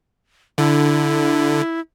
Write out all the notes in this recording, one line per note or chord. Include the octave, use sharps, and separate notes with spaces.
D3 E4